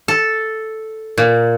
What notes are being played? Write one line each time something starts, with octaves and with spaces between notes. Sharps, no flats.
A4
A#2